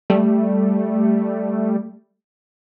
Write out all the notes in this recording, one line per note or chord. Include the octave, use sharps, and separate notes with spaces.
G3 A3